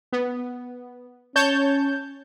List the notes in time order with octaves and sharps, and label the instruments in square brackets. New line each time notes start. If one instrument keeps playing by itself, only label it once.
[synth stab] B3
[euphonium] C#4 [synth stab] C#5 A5 G6